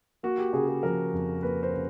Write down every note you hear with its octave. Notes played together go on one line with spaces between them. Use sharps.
A#3 F#4
G4
C#3 G#4
G#4
F3 A#4
F2
A#3 B4
C5
C#3